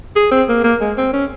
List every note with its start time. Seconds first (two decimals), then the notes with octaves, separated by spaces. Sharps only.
0.16 G#4
0.31 C4
0.49 A#3
0.64 A#3
0.81 G#3
0.97 C4
1.13 C#4